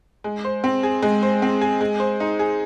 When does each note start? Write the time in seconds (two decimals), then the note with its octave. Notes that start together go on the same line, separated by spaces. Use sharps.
0.24 G#3
0.45 C5
0.64 C4
0.83 G#4
1.03 G#3
1.23 C5
1.42 C4
1.61 G#4
1.81 G#3
2.00 C5
2.20 D#4
2.39 G#4